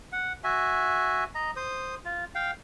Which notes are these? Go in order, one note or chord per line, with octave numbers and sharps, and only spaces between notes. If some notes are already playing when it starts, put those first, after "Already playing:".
F#5
F#4 E5 G#5
D#5 A#5
C5 D#6
F4
F5 G5